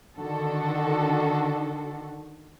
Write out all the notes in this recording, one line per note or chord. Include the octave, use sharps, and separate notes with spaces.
D3 D#3 F#4 A4